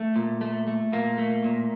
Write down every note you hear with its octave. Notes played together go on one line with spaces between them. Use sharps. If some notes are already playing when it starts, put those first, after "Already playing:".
Already playing: A3
A#2
A3
A3
A#2 A#3
A3
A#2